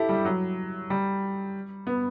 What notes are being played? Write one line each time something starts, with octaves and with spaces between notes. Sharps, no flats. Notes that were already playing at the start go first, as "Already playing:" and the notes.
Already playing: E4 G4 A4
G3
F#3
G3
B3